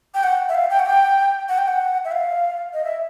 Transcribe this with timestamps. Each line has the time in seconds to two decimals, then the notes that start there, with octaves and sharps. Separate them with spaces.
0.14 G5
0.23 F#5
0.49 E5
0.54 F5
0.70 G5
0.79 F#5
0.86 G5
1.49 F#5
1.58 G5
1.67 F#5
2.04 E5
2.11 F5
2.73 D#5
2.84 E5